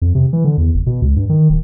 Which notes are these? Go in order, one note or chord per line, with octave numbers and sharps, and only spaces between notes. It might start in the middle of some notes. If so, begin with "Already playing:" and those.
F2
C3
E3
D3
E2
F#1
B2
C#2
G2
D#3
D#1